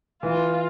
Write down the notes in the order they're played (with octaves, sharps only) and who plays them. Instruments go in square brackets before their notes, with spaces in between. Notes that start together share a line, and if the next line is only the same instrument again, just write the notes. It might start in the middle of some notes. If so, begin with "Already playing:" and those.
[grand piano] E3 [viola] F4